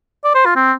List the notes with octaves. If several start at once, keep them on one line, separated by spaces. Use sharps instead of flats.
D5
C5
F4
C4